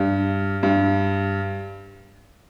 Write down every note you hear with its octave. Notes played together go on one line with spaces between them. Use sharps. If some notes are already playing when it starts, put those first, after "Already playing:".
Already playing: G2
G2